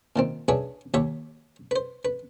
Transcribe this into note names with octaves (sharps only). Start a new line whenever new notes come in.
A#2 D#3 C4
D4 E4 F#4 G#4 B4 C#5
D#2 F#4 G4 C#5 E5
B4 C5
B4